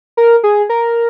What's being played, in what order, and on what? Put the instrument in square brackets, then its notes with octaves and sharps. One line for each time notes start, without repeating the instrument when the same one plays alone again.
[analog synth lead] A#4
G#4
A#4